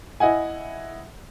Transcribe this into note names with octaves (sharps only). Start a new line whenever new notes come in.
E4 D#5 F#5 G#5